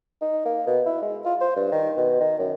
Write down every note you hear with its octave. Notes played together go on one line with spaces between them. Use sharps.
D#4
A#3
B2
E4
G#3
F4
C5
G2
D#3
B2
D#3
F#2